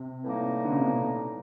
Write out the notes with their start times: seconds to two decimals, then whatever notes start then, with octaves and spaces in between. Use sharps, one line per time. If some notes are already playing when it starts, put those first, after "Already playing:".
Already playing: C3
0.23 A2 E3 G3 A#3 D#4
0.65 D3
0.71 C#3
0.78 C3
0.86 B2